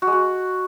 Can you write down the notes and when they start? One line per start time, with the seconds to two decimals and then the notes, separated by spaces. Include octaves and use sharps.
0.02 F#4
0.07 G#3
0.12 F#4